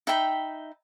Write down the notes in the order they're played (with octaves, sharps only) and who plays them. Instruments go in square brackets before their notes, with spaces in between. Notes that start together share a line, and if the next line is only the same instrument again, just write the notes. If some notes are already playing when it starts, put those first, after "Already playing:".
[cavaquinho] D#4 E5 G5 B5